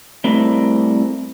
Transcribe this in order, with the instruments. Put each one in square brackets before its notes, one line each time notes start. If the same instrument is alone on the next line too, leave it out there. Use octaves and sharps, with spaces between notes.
[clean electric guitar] G3 A3 C4 E4 A#4